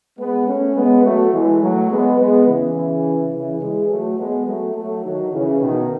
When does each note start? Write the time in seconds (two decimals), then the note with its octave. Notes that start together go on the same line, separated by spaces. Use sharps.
0.19 G#3 B3
0.47 A3 C#4
0.75 G#3 B3
1.04 F#3 A3
1.33 E3 G#3
1.62 F#3 A3
1.90 G#3 B3
2.19 G#3 B3
2.47 C#3 E3
3.33 C#3 E3
3.61 E3 G#3
3.89 F#3 A3
4.18 G#3 B3
4.47 F#3 A3
4.75 F#3 A3
5.04 D#3 F#3
5.33 C#3 E3
5.61 B2 D#3